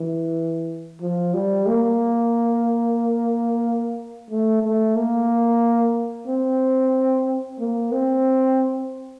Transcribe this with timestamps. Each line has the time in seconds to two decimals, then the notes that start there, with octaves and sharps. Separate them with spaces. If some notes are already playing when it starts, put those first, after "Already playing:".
Already playing: E3
1.01 F3
1.34 G3
1.67 A#3
4.30 A3
4.63 A3
4.96 A#3
6.27 C4
7.59 A#3
7.92 C4